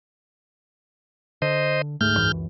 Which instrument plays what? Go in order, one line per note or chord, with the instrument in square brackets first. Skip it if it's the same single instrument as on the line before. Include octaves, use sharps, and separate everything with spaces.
[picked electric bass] D3 [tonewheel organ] C5 D#5
[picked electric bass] D2 A3 [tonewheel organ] G#2 F6 G6
[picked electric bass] C#2 F#2 E3